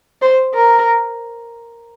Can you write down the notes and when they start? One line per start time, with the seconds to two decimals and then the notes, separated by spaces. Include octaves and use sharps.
0.22 C5
0.55 A#4